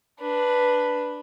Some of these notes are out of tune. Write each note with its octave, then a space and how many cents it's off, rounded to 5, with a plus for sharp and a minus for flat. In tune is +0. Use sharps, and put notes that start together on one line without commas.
D4 +0 B4 +0